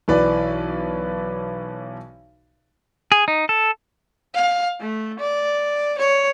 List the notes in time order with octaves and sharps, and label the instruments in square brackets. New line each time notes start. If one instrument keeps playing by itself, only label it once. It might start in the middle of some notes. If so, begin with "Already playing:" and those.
[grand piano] B1 E3 B4 D5
[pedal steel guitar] G#4
D#4
A4
[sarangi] F5
A3
D5
C#5